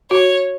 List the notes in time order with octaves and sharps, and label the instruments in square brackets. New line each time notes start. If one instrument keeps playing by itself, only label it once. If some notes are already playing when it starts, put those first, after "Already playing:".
[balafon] F#4 [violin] C#5